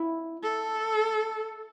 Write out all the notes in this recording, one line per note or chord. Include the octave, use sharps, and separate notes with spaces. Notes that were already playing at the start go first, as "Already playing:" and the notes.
Already playing: E4
A4